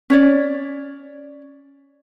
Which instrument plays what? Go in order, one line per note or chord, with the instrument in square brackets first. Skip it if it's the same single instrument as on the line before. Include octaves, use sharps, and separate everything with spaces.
[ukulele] C#4 C#5 D5